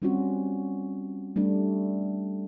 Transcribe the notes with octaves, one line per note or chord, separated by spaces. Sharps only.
G3 C4 C#4 F4 F#4
G3 A3 D4